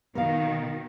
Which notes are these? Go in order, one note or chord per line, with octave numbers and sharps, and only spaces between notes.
B2 D#3 A#4 F5